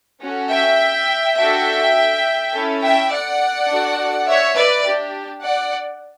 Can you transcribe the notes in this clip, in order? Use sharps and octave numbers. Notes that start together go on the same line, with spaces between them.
C#4 F#4 A4
E5 G5
D4 F#4 A4 E5 G5
C#4 E4 A4
E5 G5
D5 F#5
D4 F#4 A4
C#5 E5
B4 D5
D4 G4
D5 F#5